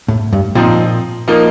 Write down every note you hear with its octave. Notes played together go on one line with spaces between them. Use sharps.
A2
G2
A#2 F3 C4 D#4
F3 A#3 D#4